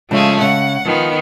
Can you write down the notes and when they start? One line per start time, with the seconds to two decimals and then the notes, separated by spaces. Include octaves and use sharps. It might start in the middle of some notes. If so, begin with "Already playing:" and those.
0.11 C#3 F3 G#3 A3 G#4
0.41 C#3 F#5
0.86 D#3 F3 B3